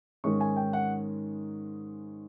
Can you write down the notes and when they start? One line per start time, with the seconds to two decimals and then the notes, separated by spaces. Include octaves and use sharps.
0.24 G#2 D#3 G#3 C#4 C#6
0.41 G#5
0.56 G5
0.73 F#5